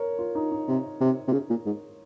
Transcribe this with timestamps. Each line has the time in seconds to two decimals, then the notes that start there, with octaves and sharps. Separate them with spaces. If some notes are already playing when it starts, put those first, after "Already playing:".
Already playing: A#4 C#5
0.19 F4
0.35 D#4
0.52 D#4
0.68 C3
1.01 C3
1.28 C3
1.32 C#3
1.50 A#2
1.66 G#2